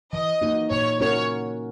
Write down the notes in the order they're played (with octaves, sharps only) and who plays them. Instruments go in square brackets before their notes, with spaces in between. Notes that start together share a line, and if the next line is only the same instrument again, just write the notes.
[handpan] E3 [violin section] D#5
[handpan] A#3 D#4 F#4
[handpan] A#2 [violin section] C#5
[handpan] A#3 C#4 F#4 A#4 [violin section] C#5